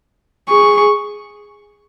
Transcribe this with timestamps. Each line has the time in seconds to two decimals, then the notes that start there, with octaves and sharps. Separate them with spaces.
0.49 G#4 C#6